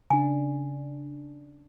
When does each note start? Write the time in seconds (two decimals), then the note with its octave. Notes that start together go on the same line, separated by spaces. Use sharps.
0.10 C#3 D4 G#5